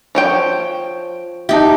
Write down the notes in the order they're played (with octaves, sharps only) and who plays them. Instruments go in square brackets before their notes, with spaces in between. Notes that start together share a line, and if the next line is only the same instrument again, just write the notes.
[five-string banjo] F3 C#5 G5
[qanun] D#4 G4 [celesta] E5 A5